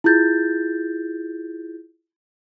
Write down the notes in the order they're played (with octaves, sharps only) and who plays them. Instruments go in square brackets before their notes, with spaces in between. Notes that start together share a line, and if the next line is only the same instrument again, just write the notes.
[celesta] E4 F4 G#4 G6 A6